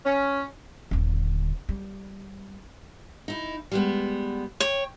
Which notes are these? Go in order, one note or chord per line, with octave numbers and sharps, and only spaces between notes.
C#4
D#1 D3
G3
D#4 E4
G3 G#3 B3
C#5 G5